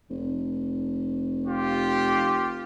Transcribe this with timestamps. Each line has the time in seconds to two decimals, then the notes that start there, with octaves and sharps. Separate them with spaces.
0.10 F1
1.46 F4 G4